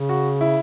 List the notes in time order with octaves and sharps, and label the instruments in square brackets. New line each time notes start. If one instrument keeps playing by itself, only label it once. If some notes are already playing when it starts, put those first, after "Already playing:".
Already playing: [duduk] C#3
[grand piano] F#4
E4